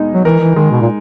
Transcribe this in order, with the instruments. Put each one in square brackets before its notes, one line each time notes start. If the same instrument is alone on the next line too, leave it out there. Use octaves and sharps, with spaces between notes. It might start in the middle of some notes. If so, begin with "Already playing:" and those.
Already playing: [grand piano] B2 G#3 D#4
[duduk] F#3
[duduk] E3 [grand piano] A#4
[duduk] E3
[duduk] D#3 [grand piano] G#3
[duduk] B2
A#2